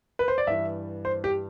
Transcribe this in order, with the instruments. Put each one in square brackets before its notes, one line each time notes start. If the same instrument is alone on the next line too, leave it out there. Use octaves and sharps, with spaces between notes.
[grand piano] B4
C5
D5
G2 E3 E5
C5
G4